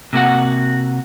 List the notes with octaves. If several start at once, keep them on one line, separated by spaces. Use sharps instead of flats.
C3 A#3 F#4 F#5